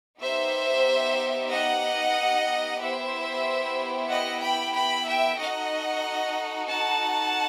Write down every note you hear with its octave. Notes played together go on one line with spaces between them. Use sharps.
B3 D#4 G4 C5 E5
D#5 F#5
B3 E4 G4 C5 E5
D#5 F#5
G5 B5
G5 B5
E5 G5
D#4 F#4 A4 D#5 F#5
F#5 A5